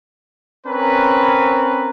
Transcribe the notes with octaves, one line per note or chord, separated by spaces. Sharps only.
C4 C#4 A#4 B4